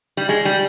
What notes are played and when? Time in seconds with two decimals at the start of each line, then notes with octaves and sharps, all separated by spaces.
0.17 G3
0.29 G#3
0.45 G3